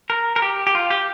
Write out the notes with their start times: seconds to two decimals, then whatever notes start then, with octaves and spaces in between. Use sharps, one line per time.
0.10 A#4
0.36 A#4
0.42 G4
0.67 G4
0.75 F4
0.90 G4